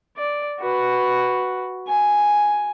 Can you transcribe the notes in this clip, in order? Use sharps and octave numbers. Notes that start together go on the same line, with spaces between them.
D5
F#4 B4
G#5